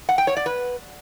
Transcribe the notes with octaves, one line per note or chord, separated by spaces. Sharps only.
F#5
G5
C#5
D5
B4